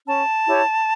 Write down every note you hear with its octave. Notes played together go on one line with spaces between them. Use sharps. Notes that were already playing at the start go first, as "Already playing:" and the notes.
C#4 A5
E4 G4 C#5